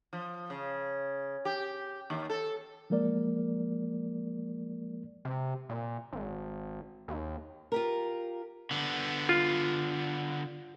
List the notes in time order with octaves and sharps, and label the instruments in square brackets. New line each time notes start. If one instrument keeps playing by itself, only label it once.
[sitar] F3
C#3
G4
D#2
A4
[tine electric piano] F3 G#3 A#3 A#4 D5
[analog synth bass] C3
A#2
G#1
D#2
[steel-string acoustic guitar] F4 G4 A#4
[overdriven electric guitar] D3 B3
[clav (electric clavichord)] F4